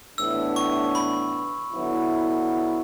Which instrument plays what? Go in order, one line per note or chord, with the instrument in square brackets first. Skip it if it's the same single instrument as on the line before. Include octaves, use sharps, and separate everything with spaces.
[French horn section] A2 E3 B3 D4 [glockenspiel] E6
[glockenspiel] C#6
B5
[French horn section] D3 F#3 B3 E4